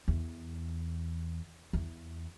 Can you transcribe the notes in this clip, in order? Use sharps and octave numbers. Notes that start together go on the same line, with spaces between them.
E2
E2